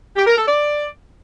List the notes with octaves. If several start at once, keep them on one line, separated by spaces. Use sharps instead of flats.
G4
A#4
A4
D5